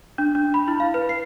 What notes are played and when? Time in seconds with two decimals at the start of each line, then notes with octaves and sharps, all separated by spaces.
0.18 D4
0.35 D4
0.54 B5
0.68 E4
0.80 F5
0.94 B4
1.09 C7